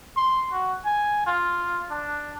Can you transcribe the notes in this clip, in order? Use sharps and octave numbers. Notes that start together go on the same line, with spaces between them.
C6
F#4
G#5
F4
D4